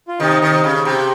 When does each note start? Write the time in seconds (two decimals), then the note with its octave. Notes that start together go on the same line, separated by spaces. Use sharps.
0.08 F4
0.20 C3 D#3 D#4
0.42 C3 D#3
0.64 C#3
0.85 C3 G4